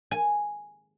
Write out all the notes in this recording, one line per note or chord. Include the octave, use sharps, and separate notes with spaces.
G#5